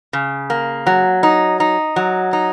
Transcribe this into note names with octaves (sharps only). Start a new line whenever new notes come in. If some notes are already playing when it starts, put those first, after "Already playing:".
C#3
A#3
F#3
D#4
D#4
F#3
D#4